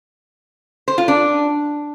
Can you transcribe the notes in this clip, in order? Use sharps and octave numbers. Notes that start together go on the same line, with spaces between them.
C5
F4
D4